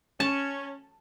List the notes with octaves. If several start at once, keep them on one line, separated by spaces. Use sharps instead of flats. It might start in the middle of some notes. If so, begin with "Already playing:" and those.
C#4 A5